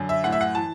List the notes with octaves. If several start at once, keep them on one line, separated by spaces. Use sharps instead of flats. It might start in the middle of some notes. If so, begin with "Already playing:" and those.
Already playing: F#2 D3
E5
A2 F#5
E5
F#5
E3 A5